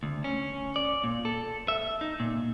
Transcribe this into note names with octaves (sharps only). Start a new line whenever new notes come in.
D2
C#4
D5
A#2
A4
E5
D#4
A#2